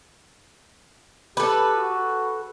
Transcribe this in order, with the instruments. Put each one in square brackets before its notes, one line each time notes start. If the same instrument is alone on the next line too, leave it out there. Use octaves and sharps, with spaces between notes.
[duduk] G4 [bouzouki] A4 B4
[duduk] F#4